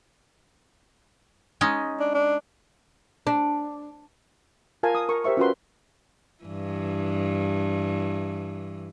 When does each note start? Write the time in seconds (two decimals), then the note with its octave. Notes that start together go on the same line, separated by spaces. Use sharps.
1.61 G#3 C#4 D#4
2.00 D4
2.14 D4
3.27 D4
4.83 F4 A#4 F5 G#5 A5
4.95 D#6
5.09 A#4 C#6
5.24 G4 A#4 C5 E5 C#6
5.37 C#4 F4 F#4 A#4 B4 C6
6.44 G2 E3